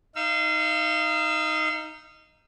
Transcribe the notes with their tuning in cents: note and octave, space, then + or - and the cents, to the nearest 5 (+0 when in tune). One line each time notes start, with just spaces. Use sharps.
D#4 +0 F5 -30 E6 +20